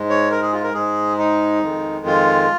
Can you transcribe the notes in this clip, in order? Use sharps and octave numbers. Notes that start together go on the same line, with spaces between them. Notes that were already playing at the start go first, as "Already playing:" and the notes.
Already playing: G#2 G#3
C#5
A#4
G#4
F4
A#4
G#2 G#3 G#4
D#4
F2 D#3 G#3
F4